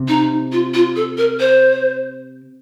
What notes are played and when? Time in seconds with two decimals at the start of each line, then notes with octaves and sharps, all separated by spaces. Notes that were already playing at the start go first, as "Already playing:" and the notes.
Already playing: C3
0.08 D#4
0.52 F4
0.74 F4
0.96 A4
1.18 A#4
1.40 C5